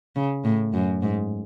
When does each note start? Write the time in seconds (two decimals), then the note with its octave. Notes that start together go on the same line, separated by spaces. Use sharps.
0.16 C#3
0.45 A2
0.73 F#2
1.02 G#2